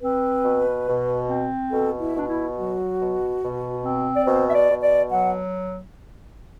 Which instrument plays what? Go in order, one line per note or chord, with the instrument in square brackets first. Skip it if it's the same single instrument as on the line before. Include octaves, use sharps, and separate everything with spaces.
[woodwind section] C4 B4
B2
B2
C4
B2 A4
E4
B2 D4
E4
F#3 F#4
B2
B2
C4
D5
B2 C5
E5
D5
B2
D5
F#3 F#5